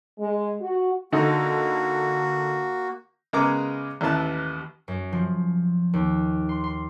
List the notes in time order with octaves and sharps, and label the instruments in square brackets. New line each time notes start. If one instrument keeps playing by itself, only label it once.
[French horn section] G#3
F#4
[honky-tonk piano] D3 D#4 [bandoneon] A#3 F#4
[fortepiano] C#3 G#3 B3 A#4 A#5 D6
A1 D#2 E3 E4 B4 A5
[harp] F#2
F3
D#2
C6
C6